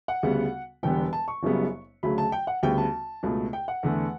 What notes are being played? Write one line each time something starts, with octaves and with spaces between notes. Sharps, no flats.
F#5
D2 C#3 G3 B3
E1 E2 D3 G3 B3 G5
A5
C#6
F#1 F#2 C#3 G3 B3
D2 C#3 F#3 A3 B5
A5
G5
F#5
D2 C#3 G3 B3 G5
A5
C#2 B2 A3
G5
F#5
E2 D3 A3